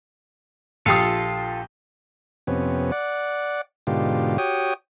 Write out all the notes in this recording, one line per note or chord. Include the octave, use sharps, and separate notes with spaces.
A#1 F4 G4 A4 F5 D#6
F2 C3 B3 C#4
D5 F#5
G#2 B2 D3 F4 G4
F#4 G4 C#5 G5 D#6